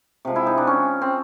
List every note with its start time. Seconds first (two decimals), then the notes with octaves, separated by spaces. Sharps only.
0.25 C3 F3 G#3
0.36 E4
0.47 D#4
0.58 D4
0.67 C#4
1.01 C4